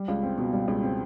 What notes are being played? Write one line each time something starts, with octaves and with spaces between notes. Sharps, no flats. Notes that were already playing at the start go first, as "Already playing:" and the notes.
Already playing: G3
C#2
C4
B2
G3
C#2
C4